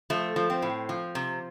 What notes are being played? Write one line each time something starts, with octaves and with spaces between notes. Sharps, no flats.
F3 A3
F3
C4
A2
F3
C3